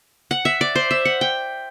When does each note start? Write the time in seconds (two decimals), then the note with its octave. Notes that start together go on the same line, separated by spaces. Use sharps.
0.31 F#5
0.45 E5
0.61 D5
0.75 C5
0.91 E5
1.05 F#5
1.21 G5